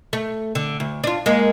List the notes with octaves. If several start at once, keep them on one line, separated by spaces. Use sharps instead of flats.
A3
D3
D2
D4 F4
G#3 A#3